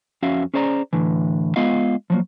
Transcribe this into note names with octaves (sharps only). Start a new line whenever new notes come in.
F2 C#4 F#4 E5 F5
C#4 G#4 C5 D5 E5 A#5
A2 D3 E3
G#3 B3 F4 D#5 F5
F3 F#3 A#3